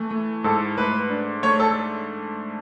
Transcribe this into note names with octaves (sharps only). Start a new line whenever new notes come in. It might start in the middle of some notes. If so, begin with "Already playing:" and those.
Already playing: E3 A3
A3
G#2 A4
A3 B4
D4
A3 C#5
A4